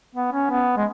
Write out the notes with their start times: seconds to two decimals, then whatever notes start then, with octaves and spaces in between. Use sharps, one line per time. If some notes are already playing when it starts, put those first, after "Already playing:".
0.15 B3
0.32 C#4
0.50 B3
0.77 G#3